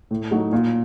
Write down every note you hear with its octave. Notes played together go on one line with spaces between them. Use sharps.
A2
F#3 A3 D#4 F#4
A#2